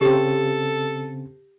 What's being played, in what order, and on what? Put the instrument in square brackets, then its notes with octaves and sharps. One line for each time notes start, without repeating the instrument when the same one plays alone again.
[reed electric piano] C#3 C4 [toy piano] G4 [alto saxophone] A4